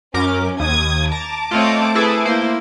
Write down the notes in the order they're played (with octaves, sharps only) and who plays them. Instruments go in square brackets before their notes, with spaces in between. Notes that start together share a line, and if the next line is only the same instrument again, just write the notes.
[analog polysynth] F#2 A#4 D6 [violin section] C#4
[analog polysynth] D#2 [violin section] D#6 G#6
[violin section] A5 D6 [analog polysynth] A#5 A6
[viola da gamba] A3 C4 C#5 [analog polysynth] F4 D#5
[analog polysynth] E4 G#4 A4 [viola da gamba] B4
[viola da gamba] A#3 E4 [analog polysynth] C5